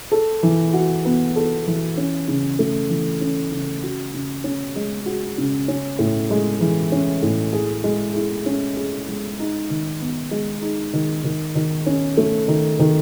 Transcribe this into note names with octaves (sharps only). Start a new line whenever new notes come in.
A4
E3
F#4
B3
A4
E3
C#4
C#3
A3
E3
C#4
C#3
F#4
C#3
C#4
G#3
F#4
C#3
C#4
A2
G#3
E3
C#4
A2
G#4
G#3
E4
C#4
G#4
G#3
D#4
D#3
B3
G#3
D#4
D#3
D#3
D#3
C#4
A3
D#3
D#3